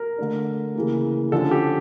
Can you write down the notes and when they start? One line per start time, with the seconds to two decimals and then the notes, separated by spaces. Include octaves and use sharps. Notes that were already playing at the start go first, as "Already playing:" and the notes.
Already playing: A#4
0.18 D3 A3 D4
0.75 C#3 E3 A#3
1.32 D3 F3 C#4 A4
1.51 G4